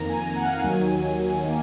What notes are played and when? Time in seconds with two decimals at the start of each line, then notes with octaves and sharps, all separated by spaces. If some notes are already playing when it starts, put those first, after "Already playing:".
Already playing: F2 D#3 A#3 A#5
0.10 G#5
0.36 F#5
0.46 F5
0.54 F#5
0.64 D#2 D#3 F#3 G#5
1.43 D#3 A#3